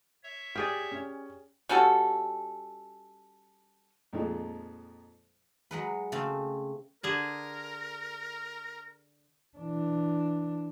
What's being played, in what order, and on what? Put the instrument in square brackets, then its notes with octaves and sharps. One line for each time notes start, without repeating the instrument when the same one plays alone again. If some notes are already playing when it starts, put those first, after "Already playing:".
[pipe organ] C#5 E5
[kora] G4 G#4 D5 [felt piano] F6
[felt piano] C#4
[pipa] G3 C#4 F#4 A4
[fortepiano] F2 A#2 F3 G#3 D#4
[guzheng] F#3 G#3 B4
C#3 A3 C4
[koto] D3 G#4 A5 [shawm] A#4
[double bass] E3 D4